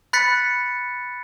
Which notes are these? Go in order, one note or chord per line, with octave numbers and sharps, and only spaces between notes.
B5 F#6 A6 B6 C#7